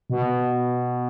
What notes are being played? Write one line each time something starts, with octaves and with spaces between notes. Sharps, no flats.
B2